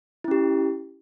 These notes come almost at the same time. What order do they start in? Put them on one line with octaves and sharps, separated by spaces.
E4 C#4 G4